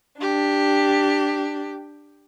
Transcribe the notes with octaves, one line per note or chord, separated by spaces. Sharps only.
D4 G4